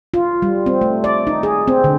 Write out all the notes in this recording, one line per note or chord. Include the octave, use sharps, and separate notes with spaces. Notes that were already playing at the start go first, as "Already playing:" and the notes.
F4
G3
C4
A3
D5
D#4
G#4
C4
D3